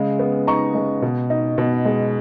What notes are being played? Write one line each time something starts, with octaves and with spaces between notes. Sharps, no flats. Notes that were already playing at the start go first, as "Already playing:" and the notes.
Already playing: C#3 G#3
B3
D#4 A#5 C#6
G#3
B2
D#4
B2
G#3